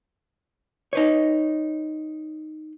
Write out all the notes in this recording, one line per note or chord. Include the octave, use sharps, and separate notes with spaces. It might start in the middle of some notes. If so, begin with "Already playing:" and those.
D#4 B4 C#5